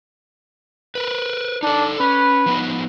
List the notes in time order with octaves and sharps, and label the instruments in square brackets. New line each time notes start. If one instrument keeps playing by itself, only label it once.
[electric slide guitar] A#4 B4
[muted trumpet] D4 [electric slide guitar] D#4 A4
[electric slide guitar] C#4 [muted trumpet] B4
[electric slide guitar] F3 B3 D#4